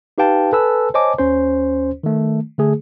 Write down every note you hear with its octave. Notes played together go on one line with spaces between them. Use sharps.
D#4 G4 B4 F5 G5 A5
A4 B4 G#5 A5 E6
C5 C#5 D#5 G#5 A5 D6
D#2 C#4 C5
D#3 A3
D3 A3 G#4